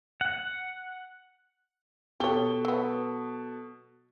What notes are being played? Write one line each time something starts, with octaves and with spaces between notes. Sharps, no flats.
F#5
B2 G4 A4 C#5 G7
F#3 B3